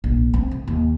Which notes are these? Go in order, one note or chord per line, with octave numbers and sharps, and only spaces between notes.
A#1
C4
D3
D#2